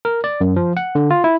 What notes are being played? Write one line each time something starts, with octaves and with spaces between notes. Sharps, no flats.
A#4
D5
F#2
F3
F#5
D3
F4
E4